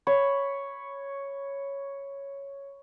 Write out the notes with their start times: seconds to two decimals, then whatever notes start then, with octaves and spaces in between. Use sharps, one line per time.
0.07 C#5 B5